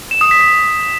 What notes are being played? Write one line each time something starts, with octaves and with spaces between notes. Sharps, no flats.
E7
D#6
B6
B6